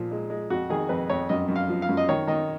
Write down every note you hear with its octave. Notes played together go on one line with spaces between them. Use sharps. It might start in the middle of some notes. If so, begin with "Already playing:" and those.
Already playing: A#2 F3
G#3
G#3
F2 F#4
D#3 G#4
F2 B4
F2 C#5
F#2 D#5
F#2
F5
F3
F5
F#2
D#5
D#3 C#5
D#3 D#5